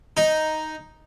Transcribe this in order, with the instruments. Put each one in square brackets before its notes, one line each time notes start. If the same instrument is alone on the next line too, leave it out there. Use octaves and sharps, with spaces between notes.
[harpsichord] D#4